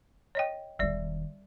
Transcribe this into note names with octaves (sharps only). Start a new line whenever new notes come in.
C#5 D#5 G5
E1 D#3 G3 D5